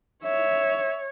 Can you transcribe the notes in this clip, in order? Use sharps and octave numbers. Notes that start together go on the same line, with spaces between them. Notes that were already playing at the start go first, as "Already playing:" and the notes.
C#5 E5